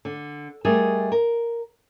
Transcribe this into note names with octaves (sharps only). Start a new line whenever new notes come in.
D3
G3 A3 G#4 A#4 D#5 E5
A#4